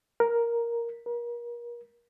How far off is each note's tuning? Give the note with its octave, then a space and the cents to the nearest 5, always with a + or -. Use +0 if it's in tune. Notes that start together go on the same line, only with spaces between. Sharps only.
A#4 +5
A#4 +35